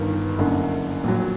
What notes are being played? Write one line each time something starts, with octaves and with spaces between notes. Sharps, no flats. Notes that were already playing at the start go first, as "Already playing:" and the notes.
Already playing: G1 G2 D#3
F#1 F#2 D3
A#1 A#2 F#3